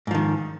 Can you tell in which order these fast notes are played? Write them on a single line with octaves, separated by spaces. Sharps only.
G#2 F3 D#3